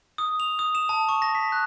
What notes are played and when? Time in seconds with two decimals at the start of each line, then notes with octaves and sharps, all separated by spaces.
0.18 D#6
0.40 F7
0.59 D#6
0.75 E7
0.89 A5
1.09 C#6
1.22 A#6
1.35 B6
1.52 F#6